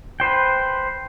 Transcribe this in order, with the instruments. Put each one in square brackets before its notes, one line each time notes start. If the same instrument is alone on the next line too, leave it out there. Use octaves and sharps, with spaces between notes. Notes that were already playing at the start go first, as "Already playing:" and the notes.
[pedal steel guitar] B4 C5 G5